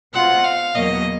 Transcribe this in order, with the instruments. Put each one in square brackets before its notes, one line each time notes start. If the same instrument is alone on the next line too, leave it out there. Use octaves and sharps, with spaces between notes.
[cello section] B2 G#3 C4 F4 [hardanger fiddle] F#5
[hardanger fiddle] F5
[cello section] E2 B2 F#3 A#3 [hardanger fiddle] D#5